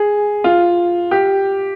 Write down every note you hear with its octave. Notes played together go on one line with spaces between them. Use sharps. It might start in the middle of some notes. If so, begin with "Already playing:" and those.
Already playing: G#4
F4
G4